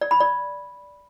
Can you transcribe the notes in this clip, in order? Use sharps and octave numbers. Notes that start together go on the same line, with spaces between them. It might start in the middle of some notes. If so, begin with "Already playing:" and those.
D5
B5
D5